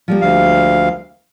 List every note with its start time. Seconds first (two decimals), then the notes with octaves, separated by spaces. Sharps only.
0.08 F3 G3 A#3
0.21 D2 F5